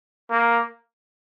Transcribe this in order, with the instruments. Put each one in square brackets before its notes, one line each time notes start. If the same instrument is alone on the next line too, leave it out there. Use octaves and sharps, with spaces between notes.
[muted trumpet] A#3